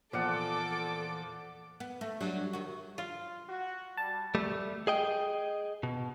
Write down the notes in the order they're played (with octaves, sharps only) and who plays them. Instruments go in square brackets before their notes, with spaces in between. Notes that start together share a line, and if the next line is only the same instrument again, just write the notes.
[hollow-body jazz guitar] E2 A#2 [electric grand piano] F3 [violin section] A4 D6 [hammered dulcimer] D5 F#5
[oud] B3
A3
F#3 G3 D4
D#3 F#4
[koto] F4
[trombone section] F#4
[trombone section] G3 [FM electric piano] A5
[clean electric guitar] G3 A3
G#4 D#5 G5
B2